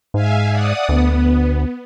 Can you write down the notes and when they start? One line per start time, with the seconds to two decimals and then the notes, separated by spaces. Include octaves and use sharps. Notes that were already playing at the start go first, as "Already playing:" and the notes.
0.14 G#2 E5 F5 G#5
0.51 D5 F#5 D#6
0.89 D2 B3